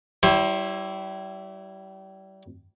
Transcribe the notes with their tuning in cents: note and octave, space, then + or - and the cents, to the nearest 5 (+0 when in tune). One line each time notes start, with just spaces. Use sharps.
G3 -35 E4 +0 C5 +30